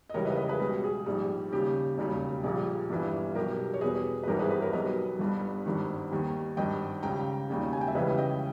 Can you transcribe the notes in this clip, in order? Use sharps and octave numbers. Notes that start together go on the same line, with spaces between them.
D#5
C#2 C#3 E3 G3 A#4 C#5
B4 D#5
B4 D#5
G#4 B4
C#2 B2 G3
G#4
A#1 G#2 G3
D#2 C#3 G3 G4
E1 D#2 C#3 G3
A#1 A#2 G3 G#4
G1 G2 E3 G3
B1 B2 G3 G4 A#4
C#5
E2 B2 G3 G#4 B4
B4
G#1 G2 E3 G3 G4 A#4
G#4 B4
G#4 B4
A#4 C#5
B1 B2 G3 B4 D#5
G1 G2 G3
G#1 G2 D#3
D#2 D#3 G3
G#1 G2 D#3 D#5 G5
C#2 C#3 G3 G5 A#5
E1 D#2 C#3 G3
G#5
G5
E5
C#2 C#3 E3 G3 B4 D#5
D#5 G5